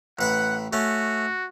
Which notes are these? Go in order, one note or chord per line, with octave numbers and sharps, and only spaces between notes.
A1 B4 F#5 B5
A3 C#4 F#4